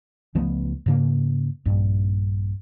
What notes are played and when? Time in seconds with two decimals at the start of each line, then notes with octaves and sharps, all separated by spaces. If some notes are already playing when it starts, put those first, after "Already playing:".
0.35 C#2 F3 A3 B3
0.86 G#2 C#3 A#3
1.65 A#1 G2